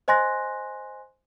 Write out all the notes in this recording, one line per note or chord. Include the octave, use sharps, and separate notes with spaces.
C5 D#5 G#5 C6 F#6 A#6